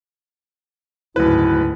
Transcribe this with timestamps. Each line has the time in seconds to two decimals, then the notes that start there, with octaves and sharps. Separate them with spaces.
1.16 F#1 D2 G#2 E4 B4